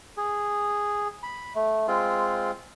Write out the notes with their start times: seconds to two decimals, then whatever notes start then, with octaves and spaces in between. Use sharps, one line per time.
0.17 G#4
1.23 B5
1.55 A3
1.88 G#3 C4 F4